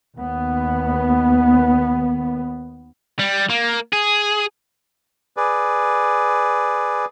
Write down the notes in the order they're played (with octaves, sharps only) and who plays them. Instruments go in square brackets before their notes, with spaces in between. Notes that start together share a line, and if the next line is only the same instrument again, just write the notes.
[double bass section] D#2 B3
[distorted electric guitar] G3
A#3
G#4
[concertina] G#4 B4 D5